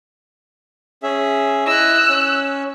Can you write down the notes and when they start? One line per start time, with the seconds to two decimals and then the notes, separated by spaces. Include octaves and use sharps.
1.03 C#4 G#4 E5
1.67 E4 D#5 E6 F#6
2.09 C#4